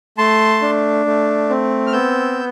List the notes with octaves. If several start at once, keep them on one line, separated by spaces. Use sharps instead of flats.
A3 A5 C6
D4
A3
C4
F6
B3 E6 G6